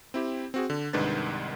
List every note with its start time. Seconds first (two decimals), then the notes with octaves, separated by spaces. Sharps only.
0.14 C4 E4 G4
0.54 C4 F#4 G#4
0.70 D3
0.93 C2 G#2 D#3 D4 B4 A6